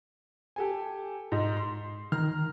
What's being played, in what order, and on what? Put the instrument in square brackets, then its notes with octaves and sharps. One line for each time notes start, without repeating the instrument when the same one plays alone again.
[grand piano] G4 A4 G#5
G#2 D#5
C6
[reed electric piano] D#3 [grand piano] A#5 F6